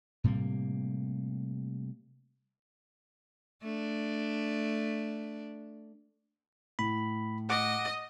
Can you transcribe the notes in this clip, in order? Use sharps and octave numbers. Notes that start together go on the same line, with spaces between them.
A2 C3 G3 A#3
A3 D4
A2 B5
D#5 F#5 D6